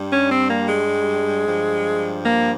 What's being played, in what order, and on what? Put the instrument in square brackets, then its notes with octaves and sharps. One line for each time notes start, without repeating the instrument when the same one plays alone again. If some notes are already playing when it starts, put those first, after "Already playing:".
Already playing: [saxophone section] G2 G3
C#4
C4
A#3
G#3
G2 F3
A#3